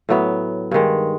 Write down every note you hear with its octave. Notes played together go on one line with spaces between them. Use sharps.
A2 F#3 B3
G2 D#3 G#3